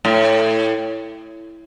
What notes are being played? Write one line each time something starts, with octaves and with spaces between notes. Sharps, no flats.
A2